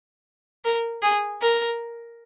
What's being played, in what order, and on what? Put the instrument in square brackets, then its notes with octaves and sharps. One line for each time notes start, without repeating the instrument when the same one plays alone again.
[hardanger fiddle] A#4
G#4
A#4